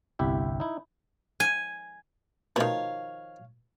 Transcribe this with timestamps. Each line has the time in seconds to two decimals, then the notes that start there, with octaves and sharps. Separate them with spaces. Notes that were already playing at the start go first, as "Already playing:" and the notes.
0.19 G1 C2 E4 G4 E5
0.60 D#4 E4
1.40 G#5
2.56 B2 D#3 F3 A3 B3 C#5 F5